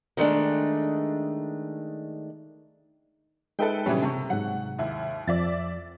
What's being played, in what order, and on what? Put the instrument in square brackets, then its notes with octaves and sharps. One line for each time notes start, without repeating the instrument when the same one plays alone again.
[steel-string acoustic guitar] D#3 G#3 A3 D4
[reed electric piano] G#3 D#4 E5 [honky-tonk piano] A4 B4 G5
[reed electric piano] A#2 F#3 C#4 [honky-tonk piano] C#3 E3 G3
[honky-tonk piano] C3 [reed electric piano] A5 A#5 C#6
[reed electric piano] G#2 C3 F#3 [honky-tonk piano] F#5
[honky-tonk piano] D#2 E4
[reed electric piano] F2 F3 [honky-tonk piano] D5 E5 A6